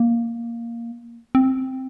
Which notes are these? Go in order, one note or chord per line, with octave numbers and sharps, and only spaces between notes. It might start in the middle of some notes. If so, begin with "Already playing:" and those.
Already playing: A#3
C4